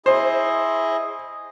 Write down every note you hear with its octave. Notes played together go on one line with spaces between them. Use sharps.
E4 G#4 C5 D#5